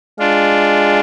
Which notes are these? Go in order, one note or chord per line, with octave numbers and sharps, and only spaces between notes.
G#3 D4 F4